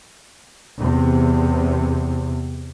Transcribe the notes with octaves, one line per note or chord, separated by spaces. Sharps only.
E2 C3